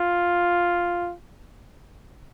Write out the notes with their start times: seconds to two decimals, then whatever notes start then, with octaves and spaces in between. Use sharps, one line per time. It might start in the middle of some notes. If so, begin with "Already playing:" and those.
Already playing: F4